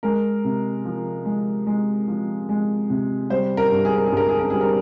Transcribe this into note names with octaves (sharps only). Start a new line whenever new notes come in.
G#3 A#4
C3
F3
G#3
G#3
F3
G#3
C3
G3 C5
A#4
G2
G#4
A#4
G#4
G2 A#4
G#4
A#4
G3 G#4
A#4